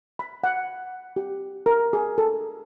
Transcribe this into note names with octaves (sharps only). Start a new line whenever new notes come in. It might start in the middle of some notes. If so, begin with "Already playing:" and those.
B5
F#5
G4
A#4
G#4
A4